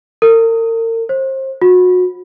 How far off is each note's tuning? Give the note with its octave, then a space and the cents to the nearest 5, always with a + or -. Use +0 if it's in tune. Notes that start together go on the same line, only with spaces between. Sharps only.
A#4 -40
C5 +30
F#4 -30